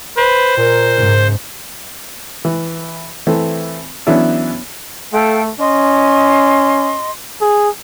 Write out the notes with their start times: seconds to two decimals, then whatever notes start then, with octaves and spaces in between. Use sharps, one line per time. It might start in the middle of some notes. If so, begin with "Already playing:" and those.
0.17 B4 C5
0.57 A#2 A#4
0.97 G#2 C#3
2.45 E3
3.27 E3 A3 C4
4.07 E3 F#3 B3 C#4 D4 E4
5.13 A3 A4 F5 G5
5.59 C#4 D#5 C6
7.41 G#4